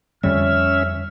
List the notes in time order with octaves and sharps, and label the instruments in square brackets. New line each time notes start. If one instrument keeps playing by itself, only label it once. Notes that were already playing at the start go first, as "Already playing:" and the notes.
[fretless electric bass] F2 D3 G3 [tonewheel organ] C#4 E5 [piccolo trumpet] F6